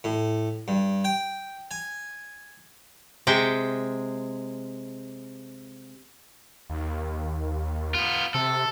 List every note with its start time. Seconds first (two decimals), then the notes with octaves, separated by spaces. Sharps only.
0.04 A2
0.68 G2
1.04 G5
1.71 G#5
3.27 C3 G#3 G5
6.70 D#2
7.95 B3 F4
8.34 C3 A4